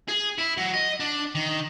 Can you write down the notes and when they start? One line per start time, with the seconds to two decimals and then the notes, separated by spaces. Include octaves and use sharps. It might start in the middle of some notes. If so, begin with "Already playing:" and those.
0.08 G#4
0.38 E4
0.57 F#3
0.74 D#5
1.00 D4
1.35 D#3